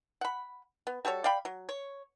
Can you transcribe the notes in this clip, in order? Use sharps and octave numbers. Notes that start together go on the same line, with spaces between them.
F#5 B5
B3
G3 F#4 A4 C#5
D5 F5 G5 B5
F#3
C#5